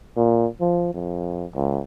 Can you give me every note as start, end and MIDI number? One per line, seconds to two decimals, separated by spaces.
0.17 0.46 46
0.61 0.92 53
0.94 1.45 41
1.55 1.82 37